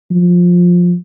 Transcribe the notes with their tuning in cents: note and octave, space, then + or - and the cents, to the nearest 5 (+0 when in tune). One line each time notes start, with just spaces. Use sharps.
F3 +15